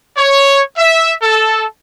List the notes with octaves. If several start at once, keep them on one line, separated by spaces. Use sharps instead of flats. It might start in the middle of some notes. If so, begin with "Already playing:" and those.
C#5
E5
A4